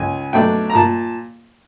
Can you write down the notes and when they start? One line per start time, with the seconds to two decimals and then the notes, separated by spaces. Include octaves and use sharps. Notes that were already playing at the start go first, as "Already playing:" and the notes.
Already playing: C#2 G#5
0.33 B2 F#3 A3 D4 G5
0.70 A#5
0.75 A#2 A5